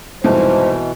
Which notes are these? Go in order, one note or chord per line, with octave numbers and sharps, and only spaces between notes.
C2 F2 G#2 B2 E3 C5